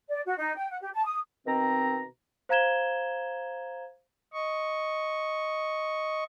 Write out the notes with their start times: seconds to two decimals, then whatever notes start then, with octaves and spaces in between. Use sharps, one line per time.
0.09 D5
0.25 F#4
0.37 D#4
0.56 G5
0.70 F#5
0.81 G4
0.93 A5
1.05 D#6
1.46 B2 D#3 C4 A#5
2.49 C5 F5 A#5 G#6 E7 G7
4.33 D#5 C#6